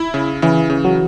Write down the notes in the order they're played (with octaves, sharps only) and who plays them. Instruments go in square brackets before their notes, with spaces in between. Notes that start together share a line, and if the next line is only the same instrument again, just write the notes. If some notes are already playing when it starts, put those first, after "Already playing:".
Already playing: [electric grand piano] E4
C#3
[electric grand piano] C#3 [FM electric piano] E3
[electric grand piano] C#3
[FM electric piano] F#3